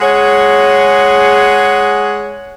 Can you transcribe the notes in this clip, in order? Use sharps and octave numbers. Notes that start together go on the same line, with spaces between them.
G#3 G#4 C#5 F#5